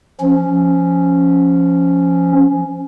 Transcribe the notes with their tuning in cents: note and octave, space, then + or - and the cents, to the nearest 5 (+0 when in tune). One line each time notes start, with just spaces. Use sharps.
F3 -10 C#4 +0